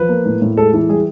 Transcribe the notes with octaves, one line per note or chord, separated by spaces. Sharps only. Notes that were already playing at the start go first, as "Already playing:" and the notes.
Already playing: F3 B4
A#3
A2
A2
G#3 A4
E3
G3 G#4